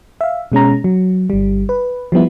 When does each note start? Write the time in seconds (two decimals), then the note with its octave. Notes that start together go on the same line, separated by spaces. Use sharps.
0.21 E5 F5
0.52 B2 G#3 C#4 A#5
0.84 F#3
1.30 G1 G3
1.69 B4
2.12 F3 G3 B3 E4